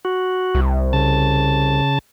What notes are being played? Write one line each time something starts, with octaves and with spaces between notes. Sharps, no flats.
F#4
C2
C#3 A5